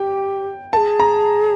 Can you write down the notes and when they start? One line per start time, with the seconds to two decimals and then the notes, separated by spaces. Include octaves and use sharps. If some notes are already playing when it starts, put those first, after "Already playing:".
Already playing: G4 G5
0.73 G#4 A#4 A5
1.00 A#5